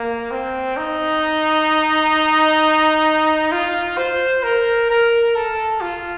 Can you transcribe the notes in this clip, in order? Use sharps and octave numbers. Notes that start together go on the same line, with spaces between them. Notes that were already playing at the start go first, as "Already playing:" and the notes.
Already playing: A#3
C4
D#4
F4
C5
A#4
A#4
A4
F4